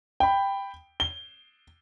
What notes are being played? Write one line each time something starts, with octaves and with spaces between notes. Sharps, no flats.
G5 B5
G7